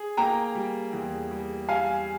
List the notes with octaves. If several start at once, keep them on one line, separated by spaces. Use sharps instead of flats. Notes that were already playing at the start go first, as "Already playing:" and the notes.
Already playing: G#4
A#3 G5 A#5
G3
E2
G3
G3 F5 G#5